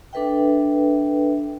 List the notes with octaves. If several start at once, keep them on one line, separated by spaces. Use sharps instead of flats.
D4 A4 B4 E5 G5